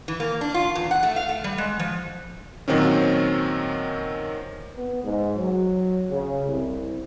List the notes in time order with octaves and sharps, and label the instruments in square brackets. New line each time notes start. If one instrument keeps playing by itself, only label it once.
[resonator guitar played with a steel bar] E3
A#3
D4
F4
E2
F#5
A3
F5
A3
G3
G#3
F3
[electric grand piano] A#2 D#3 F#3 C4 C#4
[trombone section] B3
G#2
F#3
C#3
C2